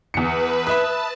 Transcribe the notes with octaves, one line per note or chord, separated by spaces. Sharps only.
E2 B4 C#7
B4 E5 A5 B5 D#6